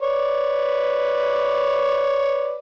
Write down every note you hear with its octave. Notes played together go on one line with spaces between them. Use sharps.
B4 C#5 D5